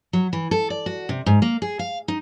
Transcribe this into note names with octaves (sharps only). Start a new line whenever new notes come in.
F#3
E3
A4
D5
F#4
C3
G#2
A#3
G#4
F5
D#4